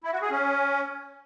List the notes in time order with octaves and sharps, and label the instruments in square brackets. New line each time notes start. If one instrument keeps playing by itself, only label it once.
[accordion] E4
F#4
G#4
C#4